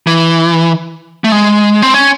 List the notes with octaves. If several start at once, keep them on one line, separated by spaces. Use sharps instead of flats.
E3
A3
G#3
C4
C#4